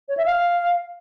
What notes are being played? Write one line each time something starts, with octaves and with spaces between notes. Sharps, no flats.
C#5
E5
F5